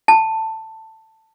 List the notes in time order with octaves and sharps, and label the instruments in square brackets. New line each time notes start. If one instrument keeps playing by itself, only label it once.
[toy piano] A5